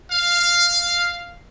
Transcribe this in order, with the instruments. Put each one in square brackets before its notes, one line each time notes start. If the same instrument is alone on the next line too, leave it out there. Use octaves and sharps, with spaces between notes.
[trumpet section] F5